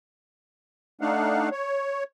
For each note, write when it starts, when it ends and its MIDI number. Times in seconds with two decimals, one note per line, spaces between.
1.01 1.49 57
1.01 1.49 62
1.01 1.49 63
1.01 1.49 77
1.01 1.49 78
1.52 2.04 73